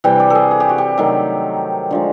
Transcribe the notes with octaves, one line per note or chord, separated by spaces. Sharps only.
C3 E3 G3 G5
D5
G#4 A4
G#4
G4
F#4
G4
C3 D#3 F#3 A3
D3 F3 G#3 F#4